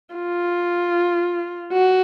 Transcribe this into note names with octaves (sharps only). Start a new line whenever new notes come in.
F4
F#4